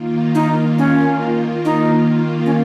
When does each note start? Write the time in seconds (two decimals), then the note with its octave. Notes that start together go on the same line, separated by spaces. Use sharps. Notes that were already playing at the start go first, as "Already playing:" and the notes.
Already playing: D#3 A#3 F4
0.35 D#4
0.78 C#4
1.65 D#4
2.46 C#4